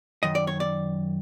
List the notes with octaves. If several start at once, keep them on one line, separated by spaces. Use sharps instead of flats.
F#2 D#3 D#5
D5
C#5
D5